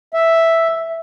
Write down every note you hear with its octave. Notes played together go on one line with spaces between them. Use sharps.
E5